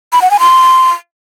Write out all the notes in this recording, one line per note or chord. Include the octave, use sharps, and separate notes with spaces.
B5
F#5
G#5
C6